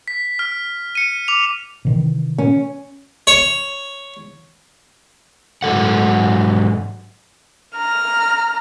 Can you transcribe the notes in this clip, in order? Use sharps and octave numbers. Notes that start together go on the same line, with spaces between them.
B6
F6
C#7 D#7
D6 F7
C3 D#3 E3
C#4
C#5
G#2 F#3 A4 F#5
A#5 F6